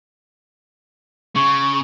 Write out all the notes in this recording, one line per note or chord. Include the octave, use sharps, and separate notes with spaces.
C#3 C#6